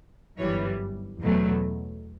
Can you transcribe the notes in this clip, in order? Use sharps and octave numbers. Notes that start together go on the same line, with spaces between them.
G1 F#2 E3 G3 C#5
E2 B2 F#3 A3